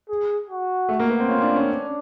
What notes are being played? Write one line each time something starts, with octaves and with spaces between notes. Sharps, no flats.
G#4
F#4
A3
A#3
B3
C4
C#4 F4
D4
C#4
D4